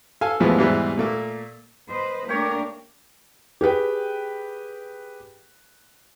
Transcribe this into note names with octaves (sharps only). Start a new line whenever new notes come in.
A4 F5 G#5
D#2 A2 E3 F3 G#3 B3
E2 G#2 B2 E3 G3 B3
A#2 A3 A#3
B4 C5 D#5
A3 A#3 D4 G4 A#4 C#5
G4 G#4 B4 G5